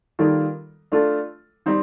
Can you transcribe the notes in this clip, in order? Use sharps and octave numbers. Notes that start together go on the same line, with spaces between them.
D#3 G3 A#3 F4 A4
A3 D4 F4 A4
G3 C4 D#4